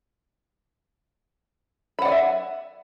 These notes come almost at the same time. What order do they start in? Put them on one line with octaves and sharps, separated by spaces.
B5 F#5 D5 G#5 E5